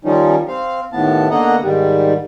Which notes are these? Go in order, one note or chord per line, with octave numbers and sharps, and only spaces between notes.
D#3 F3 G3 C#4 D#4
C4 F5
D#2 A2 B3 A5
D3 A#3 B3 D#5 F#5 A#5
G#2 D#3 G3